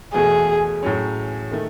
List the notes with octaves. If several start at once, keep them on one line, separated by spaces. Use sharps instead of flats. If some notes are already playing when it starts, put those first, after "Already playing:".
E2 B2 A3 G#4
A2 F#3 C#4
D#3 A3